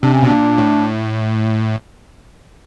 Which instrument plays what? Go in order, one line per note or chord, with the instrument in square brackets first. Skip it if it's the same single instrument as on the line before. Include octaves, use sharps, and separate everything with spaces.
[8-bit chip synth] C3 [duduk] D4
[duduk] C#4
[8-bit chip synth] B2 [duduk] D4
[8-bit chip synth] A#2
A2